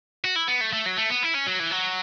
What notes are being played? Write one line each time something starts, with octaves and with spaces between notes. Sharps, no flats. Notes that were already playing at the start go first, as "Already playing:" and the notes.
F#4
E4
B3
A3
A3
F#3
A3
B3
E4
C#4
F#3
E3
F#3